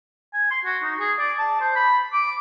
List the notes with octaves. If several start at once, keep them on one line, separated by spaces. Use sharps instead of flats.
G#5
C6
F#4
D#4
G#4
D5
A5
C5
B5
D6